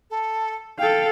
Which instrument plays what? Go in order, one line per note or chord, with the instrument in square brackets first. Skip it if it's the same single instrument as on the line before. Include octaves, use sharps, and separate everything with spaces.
[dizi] A4
[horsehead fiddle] A4 F5 [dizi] G5